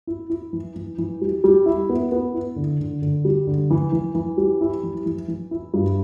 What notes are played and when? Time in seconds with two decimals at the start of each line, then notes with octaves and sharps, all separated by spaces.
0.07 E4
0.30 E4
0.53 E3
0.76 E3
0.98 E3
1.21 G3
1.44 G3
1.66 E4
1.89 B3
2.12 B3
2.34 E4
2.56 D3
2.80 D3
3.02 D3
3.25 G3
3.47 D3
3.70 E3
3.93 E3
4.15 E3
4.37 G3
4.61 E4
4.83 E3
5.06 E3
5.28 E3
5.51 E4
5.74 G2